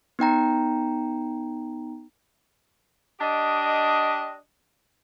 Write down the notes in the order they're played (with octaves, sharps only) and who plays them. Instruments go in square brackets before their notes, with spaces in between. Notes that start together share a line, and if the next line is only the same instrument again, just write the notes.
[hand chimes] B3 D#4 G5 A#5
[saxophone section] D4 G4 D#5